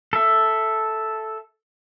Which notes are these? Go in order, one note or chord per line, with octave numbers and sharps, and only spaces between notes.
A4 E5